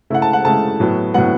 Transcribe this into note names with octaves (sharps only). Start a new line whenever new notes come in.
C#3 A3 E4 F#5
A5
F#5
C#3 A3 E4 A5
A2 F#3 B3
A2 F#3 B3 F#5